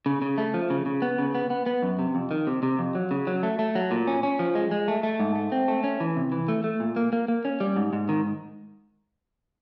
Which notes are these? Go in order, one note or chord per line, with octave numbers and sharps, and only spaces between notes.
C#3
C#3
A3
F3
C#3
C#3
B3
C#3
B3
B3
B3
F#2
C3
F2
D#3
C3
C3
F2
F#3
C#3
F#3
A3
A3
F#3
A#2
C#4
C#4
F3
G#3
G#3
A3
A3
G#2
A3
C4
A3
C#4
E3
C3
E3
A3
A3
A#2
A#3
A#3
A#3
C#4
G3
G#2
G#2
D#3